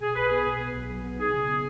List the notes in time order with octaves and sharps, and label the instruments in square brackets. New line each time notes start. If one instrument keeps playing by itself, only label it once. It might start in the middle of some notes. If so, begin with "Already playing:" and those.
[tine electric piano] B2 [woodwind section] G#4
[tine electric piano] B1 [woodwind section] B4
[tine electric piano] B3 [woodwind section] G#4
[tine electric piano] B2
B3
B1
F#3
B3
[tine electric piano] D#4 [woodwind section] G#4
[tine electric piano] C#3
B3